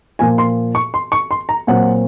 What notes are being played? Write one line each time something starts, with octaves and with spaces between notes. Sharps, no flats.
A#2 F3 A#3 G#5
C6
C#6
C6
C#6
C6
A#5
A#2 F#3 C4 F#5